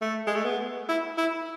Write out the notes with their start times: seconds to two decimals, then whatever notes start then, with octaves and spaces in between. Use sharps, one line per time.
0.01 A3
0.27 G#3
0.36 A3
0.44 B3
0.89 E4
1.18 E4